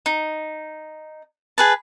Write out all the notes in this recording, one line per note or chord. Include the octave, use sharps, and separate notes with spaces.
D#4
G#4 B4 A5